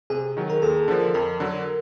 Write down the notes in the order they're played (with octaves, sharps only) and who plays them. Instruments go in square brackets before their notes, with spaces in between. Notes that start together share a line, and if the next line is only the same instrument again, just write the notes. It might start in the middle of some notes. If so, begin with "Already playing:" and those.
[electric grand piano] C3 [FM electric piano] G#4
[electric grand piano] D#3 F#3
[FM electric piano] A#4
[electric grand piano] D#2 [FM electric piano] A4
[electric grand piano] D3 F3
[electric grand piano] F2 [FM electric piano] A#4
[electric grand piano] D3 F#3